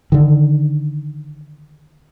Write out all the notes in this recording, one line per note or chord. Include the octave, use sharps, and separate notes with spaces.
D3 D#3